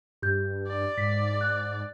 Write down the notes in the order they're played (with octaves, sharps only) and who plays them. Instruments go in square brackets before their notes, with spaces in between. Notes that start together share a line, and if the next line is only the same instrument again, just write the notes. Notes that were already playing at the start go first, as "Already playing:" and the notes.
[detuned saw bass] G2 [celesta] G4 G6
[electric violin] D5
[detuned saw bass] G#2 [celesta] B6
[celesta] F#6